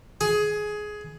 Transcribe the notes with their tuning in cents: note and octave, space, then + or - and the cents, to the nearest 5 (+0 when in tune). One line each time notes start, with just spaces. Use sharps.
G#4 +15